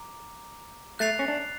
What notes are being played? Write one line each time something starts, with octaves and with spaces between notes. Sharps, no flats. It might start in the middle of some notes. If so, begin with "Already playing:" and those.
Already playing: A#5 D6
A3 F#6 A6 C7 F7
C#4
D4